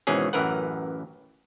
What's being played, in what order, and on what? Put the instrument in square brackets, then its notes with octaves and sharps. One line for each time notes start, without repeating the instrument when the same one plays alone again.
[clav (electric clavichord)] G#1 G#2 B2 E3 C#4 G#4
A1 F#2 E3 A#4 B4 F#5